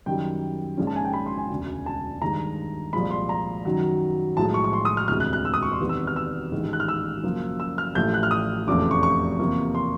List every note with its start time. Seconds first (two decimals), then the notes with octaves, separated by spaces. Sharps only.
0.06 F#2 D#3 G3 G5
0.78 A#1 G#2 F3 G#3 C#4
0.87 A5
0.96 G#5
1.05 G5
1.13 B5
1.26 C6
1.38 G#5
1.50 E1 D2 C#3
1.86 A5
2.21 G2 D#3 G#3 A#5
2.93 C2 A#2 F3 G#3 B5
3.11 C6
3.29 A#5
3.65 F#2 D#3 F#3
4.37 B1 A2 F3 G#3 A5
4.54 C#6
4.64 C#6
4.73 C6
4.85 D#6
4.97 F6
5.08 E1 D2 C3 E3 G#3 F6
5.20 F#6
5.33 F#6
5.45 E6
5.54 D#6
5.63 C#6
5.72 C6
5.80 E2 C3 D#3 G3 B3
5.89 E6
6.07 F6
6.16 E6
6.52 A1 G#2 D#3 G#3
6.73 F#6
6.80 F6
6.88 E6
7.23 F#2 C#3 F3 A#3
7.60 E6
7.78 F6
7.95 A1 A2 F3 A3 G6
8.14 F#6
8.23 F6
8.31 D#6
8.67 F1 E2 C#3 F3 A3 D6
8.91 C#6
9.03 C#6
9.39 E2 C3 F3 A#3
9.75 C6